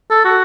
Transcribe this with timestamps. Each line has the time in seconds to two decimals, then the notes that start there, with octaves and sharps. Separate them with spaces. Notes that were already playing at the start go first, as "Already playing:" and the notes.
0.10 A4
0.25 F#4